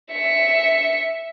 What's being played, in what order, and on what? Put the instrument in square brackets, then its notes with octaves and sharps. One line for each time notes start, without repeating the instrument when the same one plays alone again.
[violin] E5 C#7